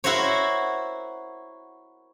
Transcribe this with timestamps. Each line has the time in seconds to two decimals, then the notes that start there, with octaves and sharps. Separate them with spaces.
0.04 E4 F#4 A#4 C5 C#5